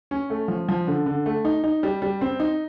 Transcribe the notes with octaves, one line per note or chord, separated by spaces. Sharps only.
C#4
A3
F3
F3
D3
D3
A3
D#4
D#4
G3
G3
C4
D#4